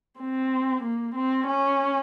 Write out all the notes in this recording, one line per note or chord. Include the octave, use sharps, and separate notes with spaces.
C4
A#3
C4
C#4